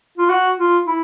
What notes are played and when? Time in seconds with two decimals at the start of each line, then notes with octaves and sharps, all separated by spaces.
0.17 F4
0.29 F#4
0.58 F4
0.87 E4